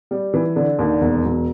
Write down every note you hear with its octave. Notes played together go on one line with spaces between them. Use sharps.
G3
E3
D3
D#2
E1
F#3